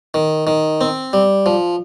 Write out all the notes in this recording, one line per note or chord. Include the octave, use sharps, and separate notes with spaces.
D#3
D#3
C4
G3
F3